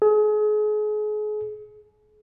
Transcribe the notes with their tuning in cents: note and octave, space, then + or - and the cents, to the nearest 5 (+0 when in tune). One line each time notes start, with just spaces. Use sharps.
G#4 +35